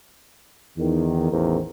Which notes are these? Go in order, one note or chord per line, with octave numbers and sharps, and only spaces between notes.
E2 D#3
A1 E2 D#3 A#4 C5